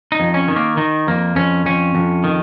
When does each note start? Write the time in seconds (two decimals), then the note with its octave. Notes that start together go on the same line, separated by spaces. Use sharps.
0.12 D#4
0.20 F2
0.34 C#4
0.48 D#3
0.56 A#3
0.77 D#3 D#4
1.07 F2 A#3
1.36 F2 C#4
1.66 F2 C#4
1.95 F2
2.24 D#3